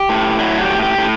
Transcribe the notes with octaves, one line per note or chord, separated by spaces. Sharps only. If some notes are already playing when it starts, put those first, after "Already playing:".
Already playing: G4
A2
F#3 E4
G4
A2
G4
A2